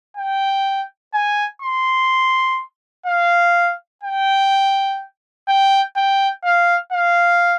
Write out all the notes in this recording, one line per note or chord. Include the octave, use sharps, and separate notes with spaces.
G5
G#5
C6
F5
G5
G5
G5
F5
F5